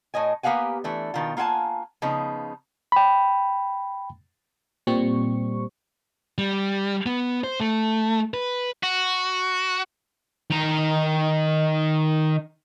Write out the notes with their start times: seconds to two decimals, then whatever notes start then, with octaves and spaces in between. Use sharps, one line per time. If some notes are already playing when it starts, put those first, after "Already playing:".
0.14 A2 C#5 D#5 G#5
0.43 A#3 B3 G4 F5 F#5 G#5
0.84 E3 A3 D4
1.14 B2 D#3 F4
1.37 A#3 F4 F#5 G#5 A5
2.02 C#3 F3 B3 D#4
2.92 G5 B5
4.87 A#2 G3 C4 C#6
6.38 G3
7.06 B3
7.44 C5
7.60 A3
8.34 B4
8.83 F#4
10.50 D#3 A#5